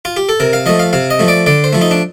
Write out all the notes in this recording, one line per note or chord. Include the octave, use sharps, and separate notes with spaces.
F4
G4
A4
C3 A#4
F5
F3 A3 D#5
F5
C3 F5
D#5
F3 A3
D5
D3 D5
C5
F3 A3
D#4
D4